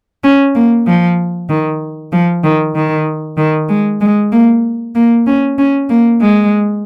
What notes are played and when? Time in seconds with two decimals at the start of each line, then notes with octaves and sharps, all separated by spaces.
0.24 C#4
0.55 A#3
0.87 F3
1.49 D#3
2.13 F3
2.44 D#3
2.75 D#3
3.38 D#3
3.69 G#3
4.01 G#3
4.32 A#3
4.95 A#3
5.27 C#4
5.58 C#4
5.90 A#3
6.21 G#3